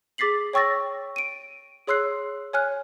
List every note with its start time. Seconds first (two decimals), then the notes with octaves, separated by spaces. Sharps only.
0.18 G#4 D6 A6 B6 C7 F#7
0.53 C#5 G5 C#6 E6 A6 A#6
1.16 D7 D#7
1.87 G#4 C#5 C6 E6 F#6 C7
2.53 C#5 G#5 F6 F#6